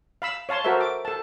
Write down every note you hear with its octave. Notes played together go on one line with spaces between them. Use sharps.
F5 B5 E6
C#5 F5 A5 C6
F#4 A4 A#4 C5 E5
D6
A4 A5